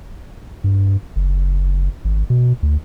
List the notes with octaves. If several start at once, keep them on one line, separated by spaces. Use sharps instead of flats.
G2
F#1
G#1
B2
D2